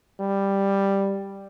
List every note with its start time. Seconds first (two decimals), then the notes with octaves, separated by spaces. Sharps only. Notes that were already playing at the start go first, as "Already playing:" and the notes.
0.20 G3